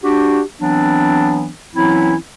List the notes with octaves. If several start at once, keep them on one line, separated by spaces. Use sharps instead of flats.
D4 F#4 G4
E3 F#3 B3 C4 D4
E3 F#3 C4 C#4 E4